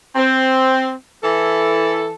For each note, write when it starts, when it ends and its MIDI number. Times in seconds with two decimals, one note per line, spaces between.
0.16 0.93 60
1.22 2.13 52
1.22 2.13 64
1.22 2.13 69